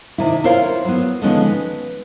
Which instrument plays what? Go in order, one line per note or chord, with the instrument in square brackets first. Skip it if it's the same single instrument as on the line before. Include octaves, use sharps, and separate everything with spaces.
[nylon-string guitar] C3 D#3 D4 E4
E4 F4 A#4 C5 C#5 F5
F#3 B3
D3 D#3 F3 G#3 B3 C#4
B4